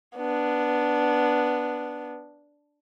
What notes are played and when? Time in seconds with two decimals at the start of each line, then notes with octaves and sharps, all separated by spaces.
0.17 B3 D4